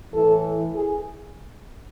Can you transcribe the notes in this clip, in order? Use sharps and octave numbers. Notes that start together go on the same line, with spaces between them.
A2 E3 A4
G#4